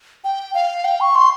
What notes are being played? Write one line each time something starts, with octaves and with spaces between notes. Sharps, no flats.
G5
F5
G5
C#6
C6